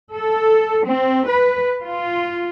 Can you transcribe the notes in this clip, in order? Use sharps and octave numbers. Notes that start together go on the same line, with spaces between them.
A4
C4
B4
F4